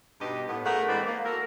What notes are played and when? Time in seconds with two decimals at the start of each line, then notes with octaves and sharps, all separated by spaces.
0.20 G2 B2 D#4 G4 D#5
0.48 A2 B3
0.64 F#2 A3 G#4 A#4 F#5
0.88 E3 G#3 C4 B4 C5 D5
1.06 A#3
1.24 F#4 A4 A#4